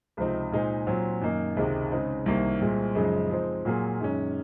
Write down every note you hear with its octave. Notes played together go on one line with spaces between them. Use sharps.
C#2 C3 F3 C4 D#4
A#2 G#3 D#4 G#4 C5
A#2 F#3 C4
F#2 D#3 A#3 D#4
C#2 C3 D#3 G#3
C#3 G#3 C4 D#4
C2 C3 D#3 A#3
C2 A#2 G#3 C4
F#2 C#3 F3 G#3 D#4
F3 G#3 C4 D#4
A#2 F#3 A#3 F4 G#4
F#2 D#3 G#3 C#4